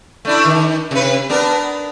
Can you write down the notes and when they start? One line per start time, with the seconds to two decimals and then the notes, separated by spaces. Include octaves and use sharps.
0.25 A3 D4 E4
0.45 D#3
0.91 C3 B4
1.29 B3 D4 A#4